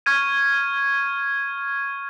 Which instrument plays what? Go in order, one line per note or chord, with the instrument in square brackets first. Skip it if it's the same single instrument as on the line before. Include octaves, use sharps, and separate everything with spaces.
[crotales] C#6 F6 G#6 D#7